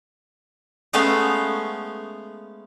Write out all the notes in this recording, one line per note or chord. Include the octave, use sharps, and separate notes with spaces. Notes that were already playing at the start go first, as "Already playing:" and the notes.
G#3 A3 B3 C#4 F5